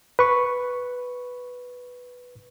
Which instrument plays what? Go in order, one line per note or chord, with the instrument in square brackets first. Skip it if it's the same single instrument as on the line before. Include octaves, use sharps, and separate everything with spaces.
[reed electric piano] B4 C#6